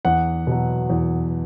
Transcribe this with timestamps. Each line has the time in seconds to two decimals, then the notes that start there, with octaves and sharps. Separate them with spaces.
0.05 E2 F#5
0.47 B2 F#3
0.90 E2